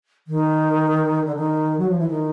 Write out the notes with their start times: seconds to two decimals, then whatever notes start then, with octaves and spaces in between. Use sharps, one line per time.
0.27 D#3
1.26 D3
1.36 D#3
1.79 F#3
1.89 F3
1.98 E3
2.08 D#3